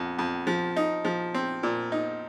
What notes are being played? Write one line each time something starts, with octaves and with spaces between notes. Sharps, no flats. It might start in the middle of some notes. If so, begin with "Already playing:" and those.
Already playing: F2
F2
F3
D#4
F3
C4
A#2
D#4